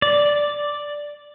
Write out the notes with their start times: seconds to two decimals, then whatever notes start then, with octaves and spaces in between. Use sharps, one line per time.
0.02 D5